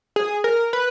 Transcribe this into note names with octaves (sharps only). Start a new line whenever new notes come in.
G#4
A#4
B4